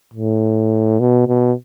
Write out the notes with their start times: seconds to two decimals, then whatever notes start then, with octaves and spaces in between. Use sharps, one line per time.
0.13 A2
1.00 B2
1.28 B2